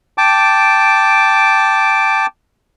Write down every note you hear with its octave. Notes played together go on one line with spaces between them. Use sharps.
G5 A5 D6